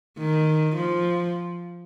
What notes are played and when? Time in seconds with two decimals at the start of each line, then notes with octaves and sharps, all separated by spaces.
0.19 D#3
0.77 F3